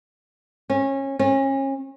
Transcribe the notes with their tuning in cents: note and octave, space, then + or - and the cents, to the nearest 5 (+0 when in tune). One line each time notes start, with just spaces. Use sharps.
C#4 -25
C#4 -35